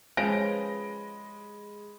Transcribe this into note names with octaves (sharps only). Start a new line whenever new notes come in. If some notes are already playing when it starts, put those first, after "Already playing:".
F3 G#3 C#4 G4 B4 A#6 D7